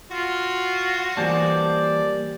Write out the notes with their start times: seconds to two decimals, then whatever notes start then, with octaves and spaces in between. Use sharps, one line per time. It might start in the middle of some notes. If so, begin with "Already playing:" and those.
0.11 F4 F#4
1.17 E3 G3 A#3 C5 D5 G#5 A5